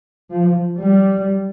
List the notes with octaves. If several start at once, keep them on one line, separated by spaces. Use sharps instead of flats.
F3
G3